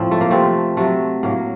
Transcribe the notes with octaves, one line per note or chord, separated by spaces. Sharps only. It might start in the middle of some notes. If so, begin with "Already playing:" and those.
Already playing: A2 F3 C4
A3
A#3
C3 F3 A3 C4
C3 F#3 A3
A2 F#3 A#3